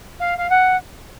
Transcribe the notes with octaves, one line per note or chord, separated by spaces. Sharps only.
F5
F5
F#5